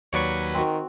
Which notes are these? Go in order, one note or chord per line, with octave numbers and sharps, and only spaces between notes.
D#2 F#3 B4 C#5 D5 C#6
D#3 C4 F#4